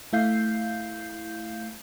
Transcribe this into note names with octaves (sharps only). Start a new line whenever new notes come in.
A3 E4 F5 G6 C7